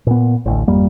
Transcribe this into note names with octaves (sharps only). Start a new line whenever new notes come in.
A#2 B3
A1 D2
G#1 F2 G3 A#3